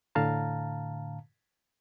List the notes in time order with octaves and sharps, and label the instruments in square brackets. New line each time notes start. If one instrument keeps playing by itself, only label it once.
[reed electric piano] A2 D3 F5 A5 A#5